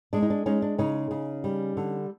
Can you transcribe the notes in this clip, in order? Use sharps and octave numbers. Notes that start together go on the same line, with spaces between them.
G#3 D4
D#4
D4
G#3 C#4 D#4
D4
C#3 C#4 D#4
C#3
G3
D3